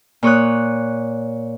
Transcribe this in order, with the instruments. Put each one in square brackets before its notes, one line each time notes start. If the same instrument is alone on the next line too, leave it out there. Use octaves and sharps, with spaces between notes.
[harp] A#2 C#5 D#6 F#6